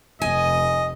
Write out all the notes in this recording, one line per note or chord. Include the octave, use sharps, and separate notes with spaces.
F1 D#5 G#5